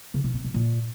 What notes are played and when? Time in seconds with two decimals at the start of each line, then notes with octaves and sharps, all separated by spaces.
0.14 C#3
0.24 B2
0.34 C4
0.44 B2
0.54 A#2